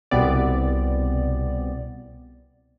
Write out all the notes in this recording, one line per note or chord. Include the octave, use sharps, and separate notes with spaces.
C2 B2 B3 C4 D5